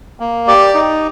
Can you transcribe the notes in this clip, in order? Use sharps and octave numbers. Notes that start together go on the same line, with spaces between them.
A#3
G4 D5
D#4